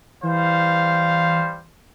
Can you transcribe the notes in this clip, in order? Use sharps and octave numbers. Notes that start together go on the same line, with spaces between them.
E3 G3 C5 F5